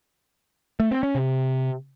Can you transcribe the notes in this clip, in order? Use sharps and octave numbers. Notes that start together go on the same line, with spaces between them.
A3
C4
C#4
C3